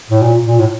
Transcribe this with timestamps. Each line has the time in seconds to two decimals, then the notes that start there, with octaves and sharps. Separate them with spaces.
0.10 A2
0.22 A#2
0.46 A#2
0.59 A2